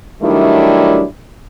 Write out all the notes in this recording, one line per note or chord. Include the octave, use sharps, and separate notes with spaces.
D#3 F#3 G3 A3 D4 E4